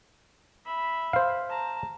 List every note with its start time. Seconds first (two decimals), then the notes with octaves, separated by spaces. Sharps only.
0.66 E5 B5
1.13 C5 F5
1.49 A5 A#5